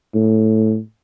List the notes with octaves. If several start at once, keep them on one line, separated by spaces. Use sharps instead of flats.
A2